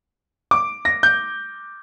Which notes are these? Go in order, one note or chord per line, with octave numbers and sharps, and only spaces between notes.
D6
A#6
G6